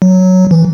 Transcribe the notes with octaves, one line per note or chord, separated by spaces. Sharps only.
F#3
E3